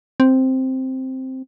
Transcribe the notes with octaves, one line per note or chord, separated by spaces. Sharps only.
C4